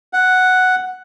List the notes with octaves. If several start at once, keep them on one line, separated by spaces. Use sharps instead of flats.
F#5